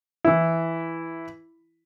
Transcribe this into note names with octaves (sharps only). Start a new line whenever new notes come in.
E3 E4